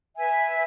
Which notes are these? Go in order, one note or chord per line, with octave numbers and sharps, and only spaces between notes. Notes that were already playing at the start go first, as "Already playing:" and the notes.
B4 E5 G#5